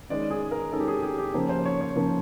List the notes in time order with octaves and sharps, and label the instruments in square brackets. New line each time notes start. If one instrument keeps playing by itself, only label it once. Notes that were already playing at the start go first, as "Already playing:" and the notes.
[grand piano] D#3 G#3 C#4 D5
G#4
A#4
D#3 G#3 C#4 A4
G4
G#4
G4
G4
C#3 F3 A#3 C#4 C5
C5
C#5
C#5
C#3 F3 A#3 C#4